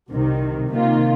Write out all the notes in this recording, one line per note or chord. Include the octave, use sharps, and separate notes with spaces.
C2 C3 D#3
C3 D#3 A#3 F4